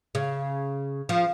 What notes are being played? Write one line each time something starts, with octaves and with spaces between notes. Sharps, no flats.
C#3
F3